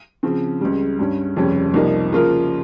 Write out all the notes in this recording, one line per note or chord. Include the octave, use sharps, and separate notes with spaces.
C#3 F3 C4
C#2 C#3 G3
G2 G3 C#4
F1 F2 C#3 G3 C#4
C2 C3 F3 A#3 D#4
C#3 F3 A#3 F4 A#4